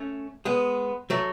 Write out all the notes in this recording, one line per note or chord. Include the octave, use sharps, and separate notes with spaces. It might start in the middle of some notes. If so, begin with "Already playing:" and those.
Already playing: A3 C#4
G#3 B3
F#3 A3